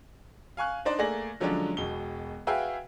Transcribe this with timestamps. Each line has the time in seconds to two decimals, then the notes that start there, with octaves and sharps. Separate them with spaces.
0.57 F5 G#5 C#6 F#6
0.85 D4 D#4 C5 D5
0.99 A3 A#3 G#4 D5 A#6 F#7
1.40 D3 F3 F#3 G#3 C#4 D4
1.77 E1 B2 G7
2.47 F#4 G#4 B4 E5 F5 G5